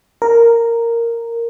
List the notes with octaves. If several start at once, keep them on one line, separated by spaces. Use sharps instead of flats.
A#4